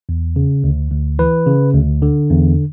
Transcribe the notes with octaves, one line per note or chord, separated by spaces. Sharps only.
E2
C#3
D2
D2
E3 B4
C#3
D2
D3
E2